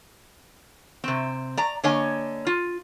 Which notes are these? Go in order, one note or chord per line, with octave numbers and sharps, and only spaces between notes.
C3 C4
D5 A#5
D3 A#3 C#5 D#5 G#5
F4